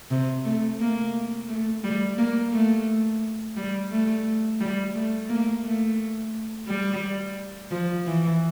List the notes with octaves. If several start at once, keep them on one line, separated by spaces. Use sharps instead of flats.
C3
A3
A#3
A3
G3
A#3
A3
G3
A3
G3
A3
A#3
A3
G3
F3
E3